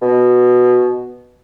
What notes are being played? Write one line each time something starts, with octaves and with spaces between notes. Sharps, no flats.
B2